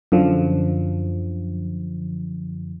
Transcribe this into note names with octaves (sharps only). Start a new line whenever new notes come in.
F#2 D3 F3